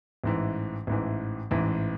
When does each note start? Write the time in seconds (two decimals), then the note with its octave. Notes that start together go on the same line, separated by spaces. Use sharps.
0.24 A1 G#2 E3
0.87 A1 G#2 E3
1.51 A1 G#2 E3